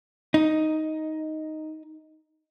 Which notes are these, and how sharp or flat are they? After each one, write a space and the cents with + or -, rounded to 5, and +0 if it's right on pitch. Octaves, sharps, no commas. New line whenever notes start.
D#4 +5